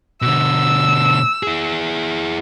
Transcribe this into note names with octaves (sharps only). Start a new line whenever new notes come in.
B2 D3 E6
E4 G#4